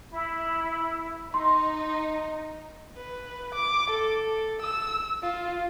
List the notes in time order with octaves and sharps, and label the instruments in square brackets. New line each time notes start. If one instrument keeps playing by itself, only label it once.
[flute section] E4
[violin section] D#4 [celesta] C6
[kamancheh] B4
D6
A4
E6
F4